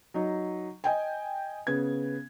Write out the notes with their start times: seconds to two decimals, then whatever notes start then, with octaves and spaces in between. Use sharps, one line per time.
0.14 F#3 D#4
0.84 D#5 G5 G#5
1.67 C#3 B3 G#6